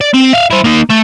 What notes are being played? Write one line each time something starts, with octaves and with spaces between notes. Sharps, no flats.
D5
C4
E5 F5
E4 C5
A#3 D#4
A3